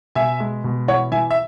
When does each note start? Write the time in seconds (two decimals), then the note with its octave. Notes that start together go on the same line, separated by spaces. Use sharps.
0.15 B2 E5 G#5
0.40 G#3
0.64 B2
0.88 E3 C#5 F#5
1.12 E3 E5 G#5
1.31 E5